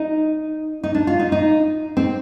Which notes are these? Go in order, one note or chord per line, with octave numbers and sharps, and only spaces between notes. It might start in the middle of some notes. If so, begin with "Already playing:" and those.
Already playing: D#4
D#4
D4
F4
D#4
D#4
C4